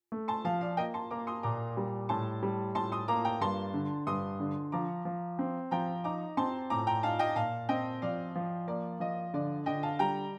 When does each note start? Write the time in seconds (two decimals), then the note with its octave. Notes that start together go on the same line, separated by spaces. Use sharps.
0.12 A3
0.28 A5 C6
0.45 F3 F5 A5
0.61 D5 F5
0.77 A#3 D#5 G5
0.94 A5 C6
1.11 A#3 A#5 D6
1.27 C6 D#6
1.43 A#2 A#5 D6
1.77 G3
2.09 A2 A5 C6
2.43 G3
2.75 A2 A5 C6
2.92 C6 D#6
3.08 A#3 A#5 D6
3.25 G5 A#5
3.41 G2 A5 C6
3.74 D3
4.07 G2 C6 D#6
4.40 D3
4.72 F3 A#5 D6
5.05 F3
5.39 C4
5.71 F3 G5 A#5
6.04 D#4 A#5 D6
6.37 C4 A5 C6
6.70 A2 A#5 D6
6.87 G5 A#5
7.03 D#4 F5 A5
7.19 D#5 G5
7.36 A#2 F5 A5
7.69 C4 D#5 G5
8.02 F3 D5 F5
8.35 F3
8.68 A#3 D5
9.00 F3 D#5
9.34 D3 D5
9.66 D3 D#5 G5
9.83 F5 A5
9.99 G3 G5 A#5